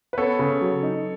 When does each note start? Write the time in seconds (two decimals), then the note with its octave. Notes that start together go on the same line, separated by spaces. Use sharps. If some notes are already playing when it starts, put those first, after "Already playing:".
0.13 B4
0.18 B3 A4 C#5
0.39 C#3
0.61 F#3
0.83 D#4